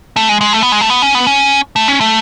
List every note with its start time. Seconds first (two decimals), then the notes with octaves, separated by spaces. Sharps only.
0.16 A3
0.29 G#3
0.41 G#3
0.53 A3
0.63 B3
0.72 G#3
0.81 A3
0.90 B3
1.02 C#4
1.15 B3
1.27 C#4
1.76 A3
1.88 C#4
2.01 A3